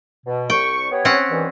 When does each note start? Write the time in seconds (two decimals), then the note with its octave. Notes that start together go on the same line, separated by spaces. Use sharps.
0.25 B2
0.50 C2 G5 C#6
0.90 B3 G4 C#5
1.05 C4 C#4 F#5
1.30 G2 D#3 E3